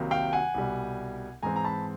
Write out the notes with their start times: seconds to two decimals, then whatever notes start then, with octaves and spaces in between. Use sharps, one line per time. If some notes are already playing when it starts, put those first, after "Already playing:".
Already playing: C2 C3 D#3 F#3 A#3
0.11 F5 G5
0.33 F#5 G#5
0.55 C2 B2 G3
1.43 G#2 E3 G#3 C4 G#5 A#5
1.56 A#5
1.65 A5 B5